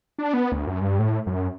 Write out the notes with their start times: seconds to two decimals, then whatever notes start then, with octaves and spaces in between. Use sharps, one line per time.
0.18 D4
0.34 B3
0.52 D2
0.67 F#2
0.81 G2
0.99 A2
1.27 F#2